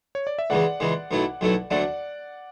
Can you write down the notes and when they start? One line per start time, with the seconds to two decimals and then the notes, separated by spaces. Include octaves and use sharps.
0.15 C#5
0.27 D5
0.39 E5
0.50 C#2 C#3 E3 G#3 D5 F#5
0.80 C#2 C#3 E3 G#3
1.11 B1 B2 F#3 A3 E4
1.41 B1 B2 F#3 A3 E4
1.71 D2 D3 F#3 A3 D5 F#5